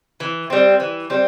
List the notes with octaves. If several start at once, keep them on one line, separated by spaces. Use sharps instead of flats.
E3
G3 C4
E3
G3 C4